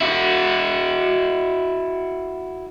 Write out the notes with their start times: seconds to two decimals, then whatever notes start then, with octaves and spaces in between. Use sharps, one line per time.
0.01 E4 F#4